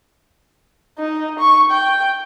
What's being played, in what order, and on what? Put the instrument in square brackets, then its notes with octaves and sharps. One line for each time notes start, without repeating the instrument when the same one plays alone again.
[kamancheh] D#4
C#6
G5